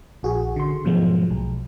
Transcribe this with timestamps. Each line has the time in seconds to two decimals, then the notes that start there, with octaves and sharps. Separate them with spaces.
0.23 A#1 F#4 G#4
0.56 D3 C6
0.85 G#2 B2 F3 F#3 G#3 A3
1.30 B1